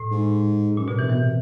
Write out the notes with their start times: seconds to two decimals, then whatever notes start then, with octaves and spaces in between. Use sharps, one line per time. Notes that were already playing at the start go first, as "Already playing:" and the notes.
Already playing: A2
0.11 G#2
0.77 F#2 A#2
0.88 G2 B2
0.98 C3 E3
1.09 B2 E3
1.20 C3